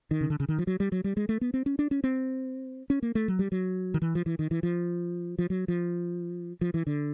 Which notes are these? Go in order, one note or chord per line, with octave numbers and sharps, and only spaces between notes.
D#3
C#3
D3
C#3
D#3
F3
F#3
G3
F#3
G3
G#3
A3
B3
C4
C#4
D4
C#4
C4
C#4
A#3
A3
F#3
G3
F#3
D#3
E3
F3
E3
D#3
E3
F3
F3
F#3
F3
F3
E3
D3